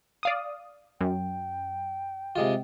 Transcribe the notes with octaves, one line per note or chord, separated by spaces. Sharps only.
D5 F5 D#6
F#2 G5
C3 G#3 F4